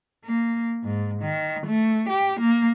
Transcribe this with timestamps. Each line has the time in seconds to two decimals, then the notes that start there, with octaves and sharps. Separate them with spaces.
0.25 A#3
0.83 G#2
1.22 D#3
1.66 A3
2.09 G4
2.40 A#3